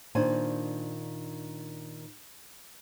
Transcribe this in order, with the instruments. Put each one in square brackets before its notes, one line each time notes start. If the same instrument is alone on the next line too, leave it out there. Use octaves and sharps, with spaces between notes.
[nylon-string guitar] A#2 D#3 D4 C5 G#5